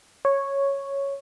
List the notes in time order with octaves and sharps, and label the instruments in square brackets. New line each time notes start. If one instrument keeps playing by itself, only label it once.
[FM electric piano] C#5